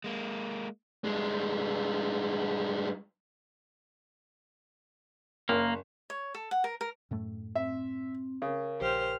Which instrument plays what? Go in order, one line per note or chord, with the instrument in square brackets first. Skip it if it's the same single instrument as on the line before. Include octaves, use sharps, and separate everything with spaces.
[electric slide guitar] G#3 A#3
[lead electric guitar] G2 G#3
[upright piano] F#1 [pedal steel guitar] A#3
[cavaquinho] C#5
A4
F#5
A#4
A#4
[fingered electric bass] F#2 A2 A3
[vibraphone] C4 [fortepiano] E5
[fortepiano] C#3 [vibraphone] A#4
[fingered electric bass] A#1 [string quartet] G4 C5 F6